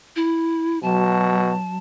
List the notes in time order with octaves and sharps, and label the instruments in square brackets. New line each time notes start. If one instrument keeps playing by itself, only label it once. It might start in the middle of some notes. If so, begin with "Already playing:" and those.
[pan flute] E4
[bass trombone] B2 [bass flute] F#3 [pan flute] A5